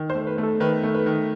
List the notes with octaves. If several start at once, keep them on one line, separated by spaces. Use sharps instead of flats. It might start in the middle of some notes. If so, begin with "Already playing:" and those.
Already playing: D#3
C5
A3
B4
A3 A4
D#3 B4
A3
B4
D#3